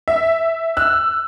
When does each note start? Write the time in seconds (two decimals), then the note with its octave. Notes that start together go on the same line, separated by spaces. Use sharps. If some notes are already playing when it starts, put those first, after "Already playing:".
0.08 E5
0.77 E6 F#6